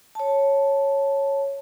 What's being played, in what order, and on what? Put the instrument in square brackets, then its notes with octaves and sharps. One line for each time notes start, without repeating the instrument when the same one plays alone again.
[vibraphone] C#5 A5